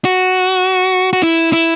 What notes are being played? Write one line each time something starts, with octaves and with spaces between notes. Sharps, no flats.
F#4
F#4
E4
E4